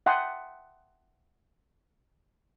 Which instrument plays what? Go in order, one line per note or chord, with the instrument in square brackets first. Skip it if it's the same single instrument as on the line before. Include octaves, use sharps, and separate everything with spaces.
[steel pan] E5 F#5 G5 A5 C6 D#6